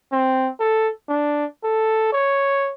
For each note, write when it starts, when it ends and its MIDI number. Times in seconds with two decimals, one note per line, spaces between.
0.12 0.50 60
0.60 0.89 69
1.09 1.45 62
1.64 2.11 69
2.13 2.73 73